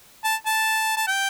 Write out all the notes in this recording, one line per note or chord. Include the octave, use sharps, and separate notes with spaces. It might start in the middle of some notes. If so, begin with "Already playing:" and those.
A5
A5
A5
G5